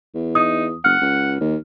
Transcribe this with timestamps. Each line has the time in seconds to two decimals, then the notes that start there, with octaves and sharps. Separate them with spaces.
0.15 E2
0.35 D#4 D#6
0.84 F#1 F#5 F6
1.02 C#2
1.40 D#2